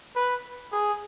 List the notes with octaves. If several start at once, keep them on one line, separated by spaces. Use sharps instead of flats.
B4
G#4